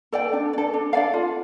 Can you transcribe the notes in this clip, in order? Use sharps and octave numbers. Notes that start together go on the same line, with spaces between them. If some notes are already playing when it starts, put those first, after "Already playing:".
A4 D5 G5
D4
D5
A4
D4
A4 D5 F5
F4